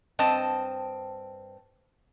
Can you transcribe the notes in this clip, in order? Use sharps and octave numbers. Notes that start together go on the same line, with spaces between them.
G2 C4 D#5 A5